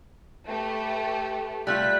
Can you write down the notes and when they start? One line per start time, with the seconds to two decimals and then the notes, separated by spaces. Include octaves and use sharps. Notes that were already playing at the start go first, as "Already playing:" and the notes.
0.48 A3 G4 B4
1.67 G3 A3 F4 F#6 B6